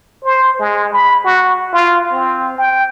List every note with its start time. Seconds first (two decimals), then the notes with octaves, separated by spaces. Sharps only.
0.24 C5
0.59 G#3
0.93 B5
1.24 F#4
1.73 F4
2.12 C4
2.58 G5